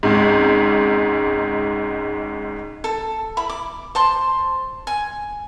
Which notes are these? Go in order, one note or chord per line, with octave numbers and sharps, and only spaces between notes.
G#1 C#2 G#2
A4
E4 B5
D6
C5 A5 C6
G#5